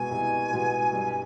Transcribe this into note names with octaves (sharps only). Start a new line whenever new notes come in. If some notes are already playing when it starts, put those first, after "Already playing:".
Already playing: C2 B2 G#3 B3 G#5
C2
B2 G#3 B3
G2